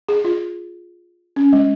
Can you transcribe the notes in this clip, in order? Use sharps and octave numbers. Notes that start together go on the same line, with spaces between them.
G#4
F4
C#4
G#3